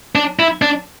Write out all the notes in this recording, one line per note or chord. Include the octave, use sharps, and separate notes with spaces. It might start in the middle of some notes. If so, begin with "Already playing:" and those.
D4
E4
D4